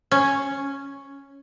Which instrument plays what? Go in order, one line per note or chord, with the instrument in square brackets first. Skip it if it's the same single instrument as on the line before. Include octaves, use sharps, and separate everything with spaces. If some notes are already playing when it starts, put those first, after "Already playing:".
[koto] C#4